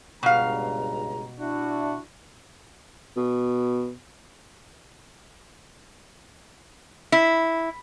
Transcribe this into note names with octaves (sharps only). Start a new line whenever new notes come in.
C#2 G2 B2 F5 A#5
D4 E4 F#4
B2
E4